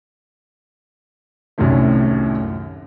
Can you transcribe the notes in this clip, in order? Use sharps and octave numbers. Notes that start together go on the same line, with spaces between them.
C2 F#2 A2 C3 D#3 A3